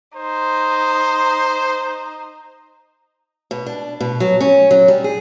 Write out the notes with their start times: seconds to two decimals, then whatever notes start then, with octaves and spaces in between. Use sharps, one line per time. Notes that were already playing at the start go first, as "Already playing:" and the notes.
0.16 D#4 C5
3.51 B2
3.66 D4
4.00 B2
4.20 F#3
4.41 C#4
4.71 F#3
4.88 G3
5.04 G#4